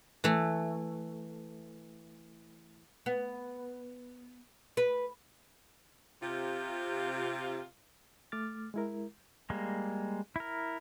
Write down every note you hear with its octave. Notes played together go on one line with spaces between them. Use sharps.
E3 A3
B3
B4
C3 F4
A3 D6 F6 A6
G#3 E4 A#4
G3 G#3 A#3
E4 A#4